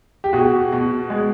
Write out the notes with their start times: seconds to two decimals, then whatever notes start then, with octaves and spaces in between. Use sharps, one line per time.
0.24 G4
0.33 B2 F#4 G#4
0.73 B2
1.10 G#3